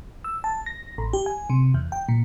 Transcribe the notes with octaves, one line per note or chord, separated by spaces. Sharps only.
E6
A5
A#6
A1
G4
G#5
C3
E2
G5
A#2